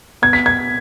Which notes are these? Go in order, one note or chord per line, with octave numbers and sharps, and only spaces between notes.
B3 G#6
B6
G#6